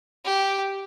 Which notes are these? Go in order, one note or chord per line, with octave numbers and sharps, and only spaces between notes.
G4